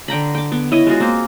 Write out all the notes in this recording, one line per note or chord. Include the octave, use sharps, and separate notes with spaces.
D3 G5 A#5 B5
G5 D6
B3
E4 C#5 D#5
G#3 F4 F#4 G#4
A#3 C4 C5